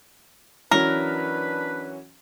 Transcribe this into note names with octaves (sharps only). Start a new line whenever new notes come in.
E3 F#3 C#4 D4 A#4 B4